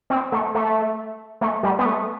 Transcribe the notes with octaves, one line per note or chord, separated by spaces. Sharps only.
C4
A3
A3
A3
G3
B3
A3